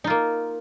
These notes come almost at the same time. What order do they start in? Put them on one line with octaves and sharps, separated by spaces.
D#4 F4 A#3